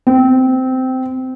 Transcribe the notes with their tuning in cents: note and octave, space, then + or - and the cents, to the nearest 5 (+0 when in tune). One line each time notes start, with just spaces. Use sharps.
C4 -15